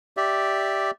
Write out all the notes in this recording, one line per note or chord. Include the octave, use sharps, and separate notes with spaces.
G4 D5 E5